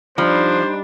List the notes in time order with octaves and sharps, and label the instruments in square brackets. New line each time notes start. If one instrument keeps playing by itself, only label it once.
[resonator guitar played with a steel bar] F3 [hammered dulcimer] G3 D#4 [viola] D4 [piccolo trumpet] C5